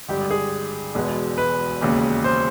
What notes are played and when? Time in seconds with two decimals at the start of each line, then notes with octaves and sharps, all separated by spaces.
0.08 G#1 G2 D3 G4
0.31 G#4
0.95 E1 E2 B2 G#3 B3
1.38 B4
1.81 E1 D#2 C#3
2.24 C5